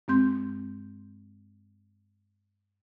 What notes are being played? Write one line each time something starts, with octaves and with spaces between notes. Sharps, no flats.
G2 G#3 C4 C6 G6